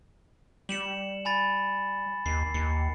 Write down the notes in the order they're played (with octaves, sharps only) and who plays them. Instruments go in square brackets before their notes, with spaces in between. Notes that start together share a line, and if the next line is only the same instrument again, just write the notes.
[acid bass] G3 [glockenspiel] C#7 E7 F#7
[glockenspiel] G#5 B5 A6
[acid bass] D#2 [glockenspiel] C7
[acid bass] D#2 [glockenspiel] C#7